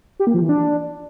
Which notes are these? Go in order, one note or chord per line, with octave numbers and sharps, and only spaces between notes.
G4
A#3
F3
E3
D4